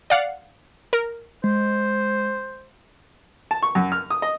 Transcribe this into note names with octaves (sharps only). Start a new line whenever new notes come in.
D5 F5 F#5
A#4
G#3 C5
A5
C#6
F#2
F6
D#6
D#5